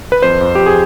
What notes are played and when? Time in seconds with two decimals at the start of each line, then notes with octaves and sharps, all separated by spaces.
0.12 B4
0.22 F2 C5
0.41 F2
0.55 F2 G4
0.66 G#4